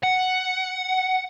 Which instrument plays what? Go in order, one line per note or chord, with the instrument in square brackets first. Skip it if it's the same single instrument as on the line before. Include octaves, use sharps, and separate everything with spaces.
[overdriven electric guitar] F#5